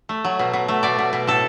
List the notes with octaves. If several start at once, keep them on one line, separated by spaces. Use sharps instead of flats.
A3
F#3
B2
B2
A3
B2 D5
B2
B2
A2 A4